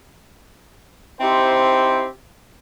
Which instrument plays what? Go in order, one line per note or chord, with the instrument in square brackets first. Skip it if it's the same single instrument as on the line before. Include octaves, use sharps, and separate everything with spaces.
[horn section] C4 D#4 E4 G4 C5